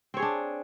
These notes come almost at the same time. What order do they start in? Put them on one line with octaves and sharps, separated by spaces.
C4 C#5 G#4 D4